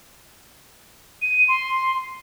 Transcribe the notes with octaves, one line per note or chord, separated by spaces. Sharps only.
D#7
C6